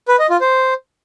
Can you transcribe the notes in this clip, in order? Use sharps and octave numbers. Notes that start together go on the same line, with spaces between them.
B4
D#5
F4
C5